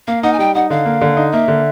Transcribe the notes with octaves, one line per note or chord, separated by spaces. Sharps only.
A#3 F5
D#4 F#5
G#5
G3 G5
D#4 F#5
D3 F5
A#3
D3
D#4
A#3 E5
D3